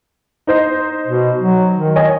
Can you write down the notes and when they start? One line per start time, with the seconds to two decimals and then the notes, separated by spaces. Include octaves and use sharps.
0.47 D#4 C5 D#5
1.07 B2
1.41 F#3
1.75 D#3
1.96 C#5 D#5 G#5